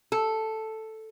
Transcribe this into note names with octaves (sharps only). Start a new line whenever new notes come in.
A4